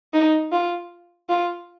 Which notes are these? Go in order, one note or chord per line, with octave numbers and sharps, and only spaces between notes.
D#4
F4
F4